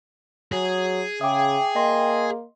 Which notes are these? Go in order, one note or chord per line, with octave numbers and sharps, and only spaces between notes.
F#3 G#4
C#3 E5 G5 D6 D#6
A#3 D#5 C6